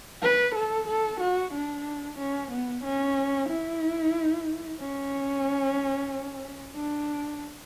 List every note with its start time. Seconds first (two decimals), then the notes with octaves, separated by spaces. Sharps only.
0.23 B4
0.55 A4
0.88 A4
1.20 F#4
1.54 D4
2.18 C#4
2.52 B3
2.84 C#4
3.49 E4
4.80 C#4
6.76 D4